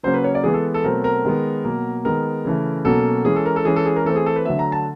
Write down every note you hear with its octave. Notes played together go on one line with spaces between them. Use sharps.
C#3 F#3 A#3 C#4 C5
B4
C#5
D5
E3 G#3 B3 G#4
A4
A4
B2 F#3 A3 C4 A#4
A#4
D#3 G#3 B3
B2 F#3 A#3
D#3 G#3 B3 A#4
C#3 E3 A3
B2 F#3 A#3 C#4 A4
E3 G#3 C#4 G#4
A4
A#4
A4
E3 G#3 C#4 G#4
A4
G#4
A#4
E3 A3 C4 A4
G#4
A4
B4
D3 F#3 A3 E5
A#5
A5